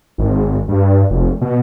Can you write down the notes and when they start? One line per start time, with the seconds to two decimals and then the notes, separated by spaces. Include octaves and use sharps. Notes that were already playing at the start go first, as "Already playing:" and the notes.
0.18 G#1
0.68 G2
1.10 F1
1.41 B2